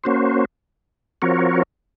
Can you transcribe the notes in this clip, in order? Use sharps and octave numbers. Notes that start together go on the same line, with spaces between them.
A#3 C#4 F#4 C5
F3 C4 F#4 A#4 C#5